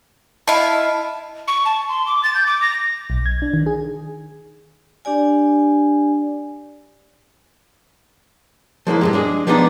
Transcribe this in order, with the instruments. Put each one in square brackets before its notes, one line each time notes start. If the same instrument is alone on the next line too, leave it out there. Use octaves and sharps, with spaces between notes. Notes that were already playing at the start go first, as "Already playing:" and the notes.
[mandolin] E4 F5 [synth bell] D#5 A5
[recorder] C#6
A5
C6
D6
A6
G6
D6
A#6
[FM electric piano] B1
G#6
D4
D#3
G#4
[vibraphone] D4 G4 D5 G#5
[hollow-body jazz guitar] F3 G#3 A#3 E4
G2 C#3 G#3
G#3 D4 G#4 D#5
F3 G#3 B3 D4 D#4 D5